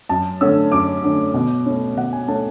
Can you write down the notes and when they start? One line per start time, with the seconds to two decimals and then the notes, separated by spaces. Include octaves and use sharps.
0.09 F#2 A5
0.41 D3 A3 C#4 E6
0.72 F#2 D6
1.03 D3 A3 C#4
1.34 B2
1.66 A3 C#4
1.97 B2 F#5
2.13 G#5
2.28 A3 C#4 A5